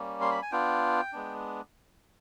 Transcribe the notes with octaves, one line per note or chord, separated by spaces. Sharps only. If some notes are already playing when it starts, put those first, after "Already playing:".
Already playing: G3 A#3 C#4
C6
B5
G#5
B3 D4 F4 G5
G#3 B3 D4